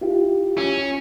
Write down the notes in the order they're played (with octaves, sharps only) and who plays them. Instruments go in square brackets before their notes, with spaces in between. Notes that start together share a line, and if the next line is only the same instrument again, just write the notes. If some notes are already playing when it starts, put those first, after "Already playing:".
[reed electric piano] E4 F4 G4
[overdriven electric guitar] C#4